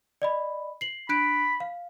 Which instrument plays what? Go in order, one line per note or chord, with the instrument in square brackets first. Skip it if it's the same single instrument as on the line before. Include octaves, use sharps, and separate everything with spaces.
[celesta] D5 D#5 B5
C7 F#7
[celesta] D4 F#6 D7 [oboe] B5
[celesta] F5